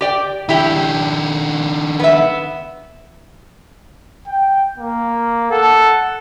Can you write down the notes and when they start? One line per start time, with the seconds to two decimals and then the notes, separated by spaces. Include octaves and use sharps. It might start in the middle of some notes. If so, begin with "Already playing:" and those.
0.01 G4 D5 G5
0.49 D#3 D4 E4 G4
2.00 B3 E5
4.27 G5
4.78 A#3
5.52 A4 F#5